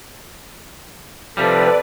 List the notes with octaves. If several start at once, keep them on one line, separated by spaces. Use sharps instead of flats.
C3 F3 G3 A4 B4 D5